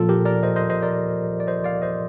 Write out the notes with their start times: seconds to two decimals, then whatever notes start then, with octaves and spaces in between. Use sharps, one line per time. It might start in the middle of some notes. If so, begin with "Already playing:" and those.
Already playing: A#2 F3 F4 A4
0.09 G4 A#4
0.25 A#4 D5
0.43 C5 D#5
0.56 C5 D#5
0.70 C5 D#5
0.82 A#4 D5
1.40 D5
1.47 C5 D#5
1.64 D5 F5
1.82 C5 D#5